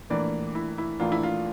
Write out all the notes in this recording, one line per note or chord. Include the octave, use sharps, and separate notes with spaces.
A#1 A2 E3 A#3 D4 D5
E4
E4
A#1 A2 E3 A#3 D4 F4
E4
F4